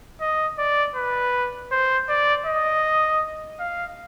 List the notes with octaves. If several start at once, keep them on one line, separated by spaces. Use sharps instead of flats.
D#5
D5
B4
C5
D5
D#5
F5